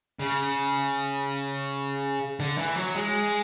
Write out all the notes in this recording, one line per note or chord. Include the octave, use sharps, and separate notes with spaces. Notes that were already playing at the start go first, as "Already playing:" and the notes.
C#3
D3
E3
F#3
G#3